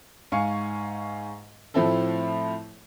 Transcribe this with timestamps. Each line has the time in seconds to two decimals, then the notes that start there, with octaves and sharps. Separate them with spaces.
0.32 G#2 F5 G#5 C#6 C#7
1.74 A2 F3 A3 C4 E4 A4